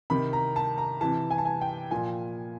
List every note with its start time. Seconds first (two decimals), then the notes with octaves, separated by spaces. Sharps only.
0.10 C3 D#3 B5
0.33 A#5
0.56 A5
0.78 A#5
1.01 C3 E3 A5
1.31 G#5
1.38 A5
1.45 G#5
1.61 G5
1.91 A#2 F3 G#5